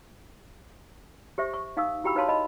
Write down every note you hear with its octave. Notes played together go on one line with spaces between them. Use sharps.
G4 C5 E5 C#6
C#6
D#4 F5 C#6 D#6 E6
E4 F#4 G4 G5 B5 E6
D#4 B4 C#5 F5 A5 C6
D#5 A5 B5